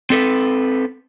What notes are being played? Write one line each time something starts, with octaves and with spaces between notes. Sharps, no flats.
C4 A4 B4